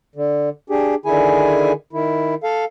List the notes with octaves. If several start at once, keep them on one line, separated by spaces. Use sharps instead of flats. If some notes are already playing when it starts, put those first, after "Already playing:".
D3
D4 G4 G#4
D3 D#3 E4 G#4 G#5
D#3 E4
A4 F5